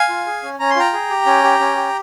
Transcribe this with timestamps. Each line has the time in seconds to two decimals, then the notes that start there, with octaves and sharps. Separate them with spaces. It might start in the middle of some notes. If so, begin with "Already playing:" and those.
Already playing: F5 G#5
0.09 F4
0.26 G#4
0.43 C#4
0.59 C#4 A#5
0.70 C6
0.76 F4 G5 A#5
0.93 G#4
1.10 G4
1.26 C#4
1.44 G4
1.60 C#4
1.76 G4